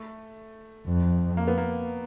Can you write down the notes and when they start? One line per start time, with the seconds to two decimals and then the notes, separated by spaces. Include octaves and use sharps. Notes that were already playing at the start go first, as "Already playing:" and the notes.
Already playing: A3
0.88 F2
1.37 A#3
1.48 B3
1.58 A#3